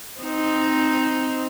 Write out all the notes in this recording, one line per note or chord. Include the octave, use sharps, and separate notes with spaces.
C4 D#4